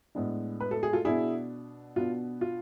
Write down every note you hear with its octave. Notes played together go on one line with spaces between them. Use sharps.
A2 G#3 B3 D4
B4
A4
G#4
F4 A4
B2 B3 D4 E4 G#4
B2 B3 D4 F4
F4